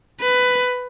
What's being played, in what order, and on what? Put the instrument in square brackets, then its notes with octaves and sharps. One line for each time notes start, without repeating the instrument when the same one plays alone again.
[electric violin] B4